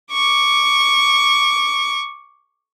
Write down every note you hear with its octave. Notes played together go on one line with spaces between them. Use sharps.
C#6 D6